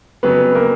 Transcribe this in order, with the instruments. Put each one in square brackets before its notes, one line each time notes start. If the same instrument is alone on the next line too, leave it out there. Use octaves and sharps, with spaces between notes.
[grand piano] F2 C#3 F#3 B3 B4
A#3 A#4